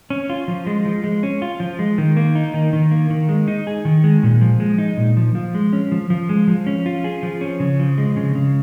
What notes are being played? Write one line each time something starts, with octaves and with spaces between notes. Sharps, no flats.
C#4
F4
F3
G#3
F3
G#3
C#4
F4
F3
G#3
D#3
A#3
D#4
D#3
D#3
A#3
D#3
G#3
D#4
G#4
D#3
G#3
A#2
F3
G#3
D#4
A#2
F3
F3
G#3
C#4
F3
F3
G#3
F3
C#4
F4
G#4
F3
C#4
C#3
F3
G#3
C#3
C#3